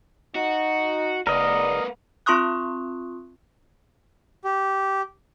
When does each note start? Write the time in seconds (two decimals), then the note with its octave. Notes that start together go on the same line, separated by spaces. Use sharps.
0.35 D#4 F#4
1.27 F#1 A#3 A#4 B4 D5 D#5
2.26 C4 F4 C6 C#6 D#6 F#6
4.45 G4